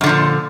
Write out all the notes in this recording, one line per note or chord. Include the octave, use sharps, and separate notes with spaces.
F#2 A#2 D3 F3